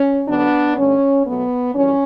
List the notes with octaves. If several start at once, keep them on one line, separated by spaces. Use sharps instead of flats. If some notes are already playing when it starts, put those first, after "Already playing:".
Already playing: C#4
D2 D3 F#3 B3 D4
G2 D3 A3 C#4
B2 F#3 A3 B3
F#2 E3 G3 C#4